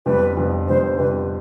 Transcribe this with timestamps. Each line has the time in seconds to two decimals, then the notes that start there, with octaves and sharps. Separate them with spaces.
0.06 F2 D3 G3 B3 B4
0.37 F2 D3 G3 B3
0.68 F2 D3 G3 B3 C5
0.98 F2 D3 G3 B3 B4